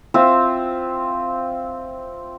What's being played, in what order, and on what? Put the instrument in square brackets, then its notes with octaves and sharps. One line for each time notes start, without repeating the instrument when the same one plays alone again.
[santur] C4 F4 E5